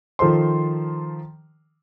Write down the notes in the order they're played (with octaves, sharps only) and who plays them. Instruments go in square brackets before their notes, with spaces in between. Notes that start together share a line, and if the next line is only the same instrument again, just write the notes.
[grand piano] D#3 F3 A4 C5 C6